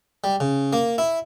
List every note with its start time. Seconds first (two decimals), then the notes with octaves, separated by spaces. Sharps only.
0.24 G3
0.40 C#3
0.73 A#3
0.98 E4